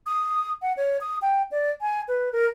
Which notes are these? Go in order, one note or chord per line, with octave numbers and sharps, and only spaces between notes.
D#6
F#5
C#5
D#6
G5
D5
G#5
B4
A#4